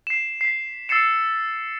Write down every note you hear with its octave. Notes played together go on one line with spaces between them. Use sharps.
C7 E7
B6 C7
E6 A6 C7 C#7 E7